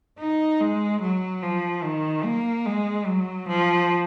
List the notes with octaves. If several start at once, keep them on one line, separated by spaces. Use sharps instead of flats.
D#4
G#3
F#3
F3
D#3
A#3
G#3
F#3
F3